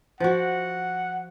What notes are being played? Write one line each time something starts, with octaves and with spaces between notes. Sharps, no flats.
F3 F#4 F#5